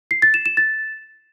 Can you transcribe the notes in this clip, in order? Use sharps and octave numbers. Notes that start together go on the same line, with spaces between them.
C7
A6
E7
E7
A6